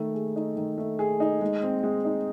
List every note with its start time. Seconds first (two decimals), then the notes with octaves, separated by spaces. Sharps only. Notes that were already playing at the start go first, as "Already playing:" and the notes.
Already playing: D#3 A3
0.14 G#4
0.36 D#4
0.57 D#3
0.78 A3
0.99 G#4
1.20 D#4
1.41 G#3
1.63 C4
1.83 G#3
2.05 D#4